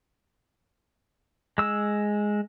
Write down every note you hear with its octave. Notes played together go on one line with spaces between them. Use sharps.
G#3 E6